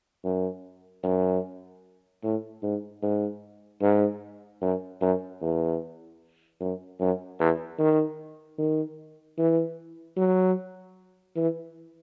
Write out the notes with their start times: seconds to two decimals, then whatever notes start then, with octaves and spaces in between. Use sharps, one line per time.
0.24 F#2
1.03 F#2
2.23 A2
2.63 G#2
3.02 G#2
3.82 G#2
4.62 F#2
5.01 F#2
5.41 E2
6.60 F#2
7.00 F#2
7.40 E2
7.79 D#3
8.58 D#3
9.38 E3
10.17 F#3
11.36 E3